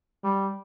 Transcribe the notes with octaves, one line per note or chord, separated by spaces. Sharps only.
G3